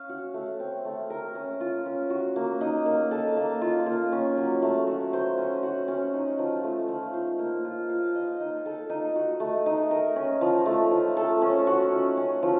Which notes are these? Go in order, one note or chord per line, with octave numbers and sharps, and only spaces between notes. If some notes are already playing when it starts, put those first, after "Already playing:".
Already playing: C#4 F5
F#4
A3
C4
A3
A#4
C#4
F4
C#4
F#4
A#3
D#4
A#3
A4
A#3
F4
A#3
C#4
F#3
A3
F#4
C5
C#4
F#4
C#4
D#4
F3
A3
F3
C5
A#3
F4
F5
D#5
D#4
A4
D#4
F#4
A3
D#4
A#4
C#4
F3
A3
F3
A4
C#4
F#4
C#4
C#4
F3